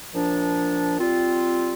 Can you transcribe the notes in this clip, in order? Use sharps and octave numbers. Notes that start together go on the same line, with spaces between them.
A#2 F3 D4
G3 C4 F4